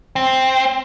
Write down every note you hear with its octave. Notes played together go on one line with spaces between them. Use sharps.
C4